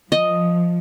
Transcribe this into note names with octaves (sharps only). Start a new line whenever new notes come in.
F3 D#5